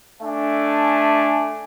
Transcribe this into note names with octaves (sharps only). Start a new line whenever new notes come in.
A3 D4 E5 G#5